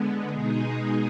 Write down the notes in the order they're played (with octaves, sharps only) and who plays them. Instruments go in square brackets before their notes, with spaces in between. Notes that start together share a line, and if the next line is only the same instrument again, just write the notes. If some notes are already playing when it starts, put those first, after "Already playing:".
Already playing: [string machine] D3 G#3 B3
B2 G#3 D#4 G#4